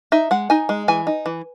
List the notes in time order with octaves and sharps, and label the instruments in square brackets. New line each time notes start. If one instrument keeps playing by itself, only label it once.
[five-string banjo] D#4 E5
G#3 F#5
D#4 G#5
G#3
E3 G#5
D#4
E3